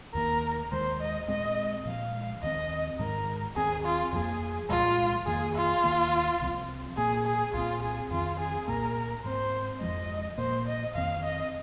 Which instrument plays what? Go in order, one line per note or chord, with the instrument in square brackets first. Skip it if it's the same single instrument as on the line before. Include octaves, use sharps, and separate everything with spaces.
[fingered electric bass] D#2 D#3 A#3 [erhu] A#4
[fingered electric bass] D#2 D#3 G#3 [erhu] C5
[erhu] D#5
[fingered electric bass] A#2 G#3 C4 [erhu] D#5
[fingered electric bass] A#2 F3 G#3 [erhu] F5
[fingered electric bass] D#2 D#3 C4 [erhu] D#5
[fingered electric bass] G#2 D#3 G#3 [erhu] A#4
[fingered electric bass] D#2 D#3 C4 [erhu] G#4
[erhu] F4
[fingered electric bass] F2 F3 A#3 [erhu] G#4
[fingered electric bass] C2 A#2 F3 G#3 [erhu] F4
[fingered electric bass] F2 D#3 A#3 [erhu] G#4
[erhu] F4
[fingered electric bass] D#2 D#3 A#3
C2 C3 F3 C4
[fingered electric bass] A#2 A#3 [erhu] G#4
[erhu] G#4
[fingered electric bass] C2 A#2 F3 C4 [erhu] F4
[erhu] G#4
[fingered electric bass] F2 D#3 C4 [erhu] F4
[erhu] G#4
[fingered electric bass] C2 A#2 A#3 [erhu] A#4
[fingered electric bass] G#2 G#3 C4 [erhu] C5
[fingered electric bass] F2 F3 G#3 [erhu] D#5
[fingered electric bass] A#2 A#3 [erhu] C5
[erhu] D#5
[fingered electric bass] F2 D#3 C4 [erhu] F5
[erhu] D#5